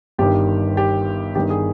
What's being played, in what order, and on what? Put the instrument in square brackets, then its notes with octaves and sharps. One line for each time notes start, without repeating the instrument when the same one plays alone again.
[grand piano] G1 G2 D#3 G4
G4
G1 G2 D#3 G4
G#4